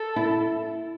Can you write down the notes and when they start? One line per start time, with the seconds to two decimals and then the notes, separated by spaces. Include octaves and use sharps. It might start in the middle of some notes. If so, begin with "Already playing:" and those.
Already playing: A4
0.16 E4